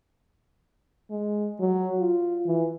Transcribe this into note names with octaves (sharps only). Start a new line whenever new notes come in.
G#3
F#3
F4
E3